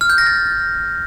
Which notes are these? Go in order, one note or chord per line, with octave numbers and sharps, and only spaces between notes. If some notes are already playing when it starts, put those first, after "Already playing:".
F6
G6
A#6
A6